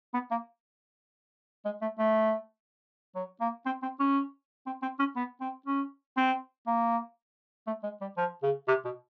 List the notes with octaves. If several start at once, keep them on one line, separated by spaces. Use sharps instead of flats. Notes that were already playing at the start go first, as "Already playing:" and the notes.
B3
A#3
G#3
A3
A3
F#3
A#3
C4
C4
C#4
C4
C4
C#4
B3
C4
C#4
C4
A#3
A3
G#3
G3
F3
C#3
C3
B2